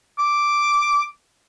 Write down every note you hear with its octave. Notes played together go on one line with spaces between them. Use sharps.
D6